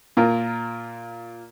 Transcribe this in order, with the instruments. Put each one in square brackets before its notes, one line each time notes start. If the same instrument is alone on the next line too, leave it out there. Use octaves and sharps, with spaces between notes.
[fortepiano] A#2 F4 A#4